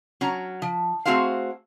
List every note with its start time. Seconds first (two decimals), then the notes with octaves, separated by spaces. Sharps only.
0.21 F#3 C#4 A#5
0.62 F3
1.05 A3 C4 F#4 G#4 C5 F5